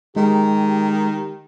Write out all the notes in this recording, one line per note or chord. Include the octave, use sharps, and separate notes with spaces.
D#3 G#3 G4